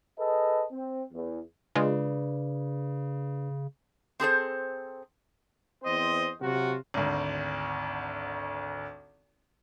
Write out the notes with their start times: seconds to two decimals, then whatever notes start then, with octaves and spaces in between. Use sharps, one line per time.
0.18 G#4 A4 B4 D#5
0.72 C4
1.13 E2
1.75 C#3 G#3 D4 F4 G#4 B4 D5
4.20 C4 G#4 A4 C5
5.83 E2 C4 C5 D#5
6.41 C3 F#3 F4 F#4
6.94 G#1 D2